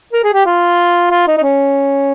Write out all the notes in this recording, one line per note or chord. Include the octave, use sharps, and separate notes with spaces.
A#4
G#4
G4
F4
F4
D#4
D#4
C#4